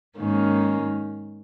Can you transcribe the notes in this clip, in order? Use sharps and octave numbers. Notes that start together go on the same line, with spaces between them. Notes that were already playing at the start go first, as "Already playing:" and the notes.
G#2 D#3 A#3 C#4